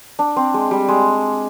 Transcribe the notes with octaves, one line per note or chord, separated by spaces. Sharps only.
D4
C4
G#3
G3
G#3